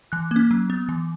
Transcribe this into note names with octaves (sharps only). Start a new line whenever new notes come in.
E3 F#6
A#3 C#4
F#3
B3
E3